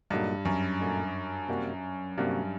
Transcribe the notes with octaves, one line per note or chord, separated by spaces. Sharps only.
G2 A#2 F#3 A3 D#4
F#2
A#2 F#3 A3 D#4
C3 G3 A#3 F#4
G2 C3 G3 A#3 F#4